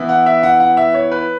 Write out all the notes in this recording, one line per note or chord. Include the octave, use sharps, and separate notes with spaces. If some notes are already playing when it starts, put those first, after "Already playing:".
Already playing: E3 B3 E4
F#5
E5
F#5
F#5
E5
C#5
B4